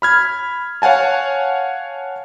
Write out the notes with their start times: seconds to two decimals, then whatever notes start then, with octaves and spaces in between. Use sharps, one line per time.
0.02 B5 F6 G#6
0.82 C#5 F5 F#5 G#5 A5